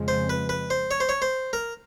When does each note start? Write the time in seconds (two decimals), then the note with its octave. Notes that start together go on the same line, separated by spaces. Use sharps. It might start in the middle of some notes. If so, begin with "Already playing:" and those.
Already playing: F2 C#3 F3 G#3
0.08 C5
0.30 B4
0.49 B4
0.70 C5
0.91 C#5
1.00 C5
1.09 C#5
1.22 C5
1.53 A#4